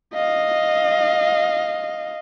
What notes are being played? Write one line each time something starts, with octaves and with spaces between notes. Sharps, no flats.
D#5 F5